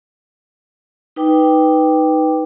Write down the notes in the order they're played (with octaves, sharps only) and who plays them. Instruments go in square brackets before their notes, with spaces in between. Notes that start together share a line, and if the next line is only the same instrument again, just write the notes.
[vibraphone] D#4 B4 G5 D6